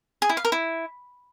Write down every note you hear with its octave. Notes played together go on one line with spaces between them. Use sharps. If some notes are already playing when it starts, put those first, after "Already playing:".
G#4
E4
F5
A#4
E4